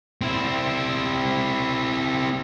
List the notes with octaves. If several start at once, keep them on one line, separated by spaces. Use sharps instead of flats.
C4 E4